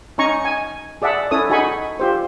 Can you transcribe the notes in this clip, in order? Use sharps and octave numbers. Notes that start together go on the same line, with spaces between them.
C#4 D#4 G#5 A#5 C#6
G#5
G#4 D5 E5 F#5 A5
C#4 E4 A4 C#5 D#6
D#4 F#4 G#4 G#5 B5 C#6
F4 G4 C5